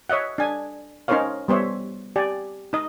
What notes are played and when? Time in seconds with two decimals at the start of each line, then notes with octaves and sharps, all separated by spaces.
0.10 C#5 D#5 E5 F#5
0.38 D4 G#5
1.08 C#4 D#4 A#4 C5 C#5 F5
1.48 G3 B3 C5 C#5 E5
2.16 G4 D5 G#5
2.73 D#4 D#5